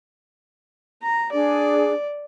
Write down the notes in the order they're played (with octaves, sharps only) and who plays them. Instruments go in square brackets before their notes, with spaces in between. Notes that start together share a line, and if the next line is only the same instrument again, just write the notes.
[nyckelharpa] A#5
[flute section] D4 G#4 [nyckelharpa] D5